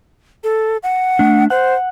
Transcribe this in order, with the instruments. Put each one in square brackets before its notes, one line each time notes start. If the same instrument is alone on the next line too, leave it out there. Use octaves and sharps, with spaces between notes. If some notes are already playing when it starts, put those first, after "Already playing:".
[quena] A4
F#5
[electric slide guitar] A3 D4
[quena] C5 [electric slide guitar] F#5